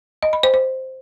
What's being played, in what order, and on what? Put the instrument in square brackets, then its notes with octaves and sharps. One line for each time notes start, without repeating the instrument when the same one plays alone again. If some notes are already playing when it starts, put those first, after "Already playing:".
[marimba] D#5
B5
C5
C5